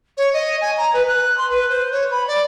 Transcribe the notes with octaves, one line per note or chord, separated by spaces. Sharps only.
C#5
D#5
G#5
A#5
B4
F#6
C6
B4
C5
C#5
B5
D5